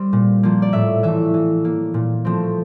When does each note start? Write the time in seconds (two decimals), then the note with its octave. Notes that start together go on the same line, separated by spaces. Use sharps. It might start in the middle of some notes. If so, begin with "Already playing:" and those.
Already playing: G3 C4
0.13 A#2
0.43 F3 A#3
0.62 D5
0.73 A2 E5
1.03 E3 A3 E5
1.34 E3
1.65 A#3
1.94 A#2
2.25 F3 A3 C4